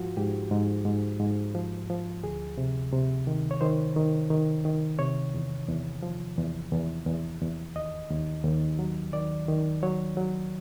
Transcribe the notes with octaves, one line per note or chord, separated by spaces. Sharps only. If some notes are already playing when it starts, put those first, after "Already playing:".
Already playing: G#2 F3 F4 F#4
G#2 G4
G#2
G#2
G#2
F3
F3
D2 G#4
C3
C3
D#3
C#5
D#3 C5
D#3
D#3
D#3
C3 C#5
E2
E2
F3
E2
E2
E2
E2
D#2 D#5
D#2
D#2
F#3
D#3 D5
D#3
F#3 C#5
F#3